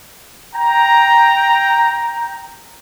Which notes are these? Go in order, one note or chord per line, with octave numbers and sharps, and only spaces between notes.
G5 A#5